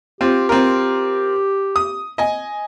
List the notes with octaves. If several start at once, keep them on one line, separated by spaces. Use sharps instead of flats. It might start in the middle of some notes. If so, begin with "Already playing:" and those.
C4 F4 G4
C4 F4 A#4
D#6
D#5 G#5